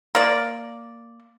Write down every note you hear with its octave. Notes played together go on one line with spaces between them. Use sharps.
A#3 D5